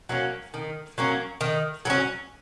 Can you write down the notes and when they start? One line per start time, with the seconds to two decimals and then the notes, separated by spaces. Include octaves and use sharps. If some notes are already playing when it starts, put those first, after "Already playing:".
0.09 F#3 A#3 C#4
0.54 D#3
0.98 F#3 A#3 C#4
1.41 D#3
1.85 F#3 A#3
1.90 C#4